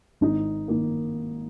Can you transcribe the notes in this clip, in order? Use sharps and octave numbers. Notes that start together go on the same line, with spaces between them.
G#1 D#4
D#3 A#3